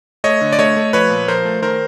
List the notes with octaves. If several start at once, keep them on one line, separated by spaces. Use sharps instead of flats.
A3 C#5 D#5
D3
D5
A3 C#5 D#5
A3
F3 B4 C#5
A#2
F3 A#4 C5
A3
D#3 A#4 C5